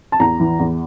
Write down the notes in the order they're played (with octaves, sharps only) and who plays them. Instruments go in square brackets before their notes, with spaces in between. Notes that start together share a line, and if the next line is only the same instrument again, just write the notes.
[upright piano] A5
E2 A#5
E3
E2